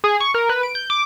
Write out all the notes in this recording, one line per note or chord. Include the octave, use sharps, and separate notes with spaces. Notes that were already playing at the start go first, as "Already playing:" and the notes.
G#4
C#6
A#4
B4
D7
G6
D6